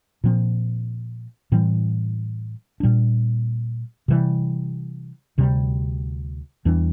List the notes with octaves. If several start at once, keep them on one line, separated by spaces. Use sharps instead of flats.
A#2 F3 C4
A2 E3 G3 C4
A#2 G3 D4
C3 E3 G3
D2 C3 G3
E2 E3 G3 D4